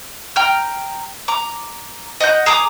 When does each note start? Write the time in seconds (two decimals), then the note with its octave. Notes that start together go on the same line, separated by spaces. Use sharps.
0.36 G5 A#5 F6
1.28 A#5 D6
2.20 D#5 F#5 G6
2.46 G#4 A#5 D6 D#6